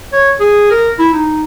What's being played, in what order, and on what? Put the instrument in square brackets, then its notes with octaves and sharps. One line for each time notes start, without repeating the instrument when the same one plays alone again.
[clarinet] C#5
G#4
A#4
E4
D#4